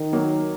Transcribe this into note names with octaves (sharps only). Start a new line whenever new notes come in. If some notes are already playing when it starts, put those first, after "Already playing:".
Already playing: D#3
F#3 A#3